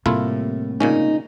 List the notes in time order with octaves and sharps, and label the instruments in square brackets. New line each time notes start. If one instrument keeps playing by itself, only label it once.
[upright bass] A2 [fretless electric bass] C3 G3 A#3 [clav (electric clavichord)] A3 E4 F4
[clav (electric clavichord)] A#2 C#3 C#4 [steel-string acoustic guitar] D#4